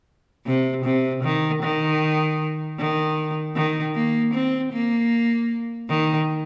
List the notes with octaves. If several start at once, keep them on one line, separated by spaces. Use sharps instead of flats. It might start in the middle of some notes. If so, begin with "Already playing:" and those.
C3
C3
D#3
D#3
D#3
D#3
A#3
C4
A#3
D#3